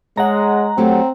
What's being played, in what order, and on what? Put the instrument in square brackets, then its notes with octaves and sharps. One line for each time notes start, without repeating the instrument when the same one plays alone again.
[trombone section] G#3 [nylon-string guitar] C#5 [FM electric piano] F#5 A#5
[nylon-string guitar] F#3 A3 G4 [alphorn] C4